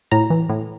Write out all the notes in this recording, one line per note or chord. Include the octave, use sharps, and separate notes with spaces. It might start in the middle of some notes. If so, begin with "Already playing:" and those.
A2 A#5
E3
A2